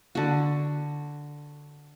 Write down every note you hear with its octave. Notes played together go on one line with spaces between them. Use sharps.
D3 F#4